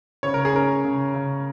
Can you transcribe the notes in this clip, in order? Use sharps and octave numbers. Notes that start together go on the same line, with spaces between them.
C#3 C#5
A#4
G#4
C#4 A#4
C#3
C#3